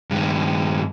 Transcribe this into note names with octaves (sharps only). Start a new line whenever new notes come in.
G2 D#3